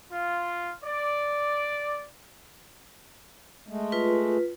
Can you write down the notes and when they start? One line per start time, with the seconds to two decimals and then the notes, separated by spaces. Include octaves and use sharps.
0.11 F4
0.84 D5
3.68 G#3 A3
3.92 F4 B4